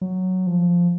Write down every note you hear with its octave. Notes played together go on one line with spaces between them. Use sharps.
F#3
F3